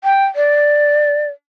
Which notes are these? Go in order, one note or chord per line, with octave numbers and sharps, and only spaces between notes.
G5
D5